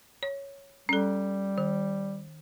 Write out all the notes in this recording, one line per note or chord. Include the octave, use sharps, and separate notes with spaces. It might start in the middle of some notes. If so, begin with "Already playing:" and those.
C#5
G3 C#4 A4
D#3